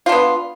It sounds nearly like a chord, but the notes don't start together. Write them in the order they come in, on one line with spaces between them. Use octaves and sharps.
F4 D4 B3